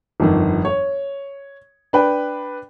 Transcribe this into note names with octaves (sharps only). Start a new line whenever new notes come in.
G1 F2 D#3
C#5
D4 B4 G5